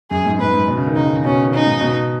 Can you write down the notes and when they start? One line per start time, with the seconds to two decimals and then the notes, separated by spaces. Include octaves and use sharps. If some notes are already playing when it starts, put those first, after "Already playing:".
0.11 F#2 G#4
0.26 G#2
0.39 G#2 B4
0.54 G#2
0.68 B2
0.77 C#3
0.87 D#3
0.96 C#3 D#4
1.06 D#3
1.15 C#3
1.25 B2 C#4
1.34 C#3
1.43 D#3
1.52 C#3 D#4
1.67 G#2
1.81 B2